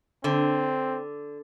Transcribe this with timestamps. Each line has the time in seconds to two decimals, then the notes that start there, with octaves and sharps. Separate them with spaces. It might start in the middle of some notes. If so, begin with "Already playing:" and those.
0.24 D3 C4